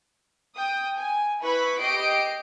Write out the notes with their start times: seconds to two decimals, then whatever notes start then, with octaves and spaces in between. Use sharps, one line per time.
0.54 G5 D#6
0.98 G#5
1.41 E4 B4 B5 C#6
1.82 G4 D#5 C7 D7